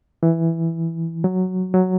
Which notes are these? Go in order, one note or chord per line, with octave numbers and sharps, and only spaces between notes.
E3
F#3
F#3